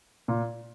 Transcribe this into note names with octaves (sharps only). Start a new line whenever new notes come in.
A#2